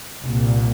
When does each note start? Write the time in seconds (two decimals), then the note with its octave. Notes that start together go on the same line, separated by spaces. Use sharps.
0.21 C2 A#2